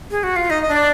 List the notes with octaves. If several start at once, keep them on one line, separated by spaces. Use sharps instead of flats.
G#4
F#4
F4
D#4 D#5
D#5
D4
D5